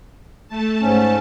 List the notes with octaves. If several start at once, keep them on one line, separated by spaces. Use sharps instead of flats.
A3 A5
G#2 C#4